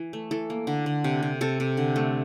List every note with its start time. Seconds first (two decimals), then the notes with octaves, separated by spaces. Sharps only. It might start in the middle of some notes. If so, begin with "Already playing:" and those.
Already playing: E3
0.13 A3
0.31 E3 A4
0.50 A#3
0.67 D3
0.86 D3
1.04 C3
1.23 C3
1.41 C3 A4
1.60 C3
1.77 D3
1.96 A3